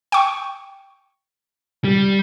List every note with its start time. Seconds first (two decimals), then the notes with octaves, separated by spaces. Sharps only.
0.12 G5 C#6
1.84 G3